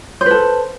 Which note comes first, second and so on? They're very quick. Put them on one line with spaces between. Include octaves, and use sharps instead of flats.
C5 B4 A4